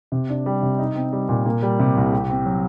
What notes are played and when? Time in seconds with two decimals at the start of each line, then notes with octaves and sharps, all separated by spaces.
0.12 C3
0.29 D4
0.46 G3
0.62 C3
0.79 D#4
0.95 C4
1.12 G3
1.29 A#2
1.45 A#3
1.62 G3
1.80 C3
1.97 C2
2.13 G4
2.30 C4
2.46 F#3